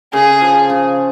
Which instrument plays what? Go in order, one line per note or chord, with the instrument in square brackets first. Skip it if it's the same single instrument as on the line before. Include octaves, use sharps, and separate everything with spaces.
[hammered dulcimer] C#3 [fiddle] G#4
[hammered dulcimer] F3
C#3